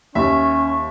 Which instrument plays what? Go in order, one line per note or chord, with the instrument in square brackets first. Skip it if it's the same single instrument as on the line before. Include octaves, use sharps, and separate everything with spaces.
[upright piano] D#2 [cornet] C#4 [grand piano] E5 [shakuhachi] C#6